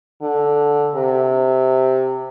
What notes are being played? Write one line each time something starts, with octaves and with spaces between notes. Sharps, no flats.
D3
C3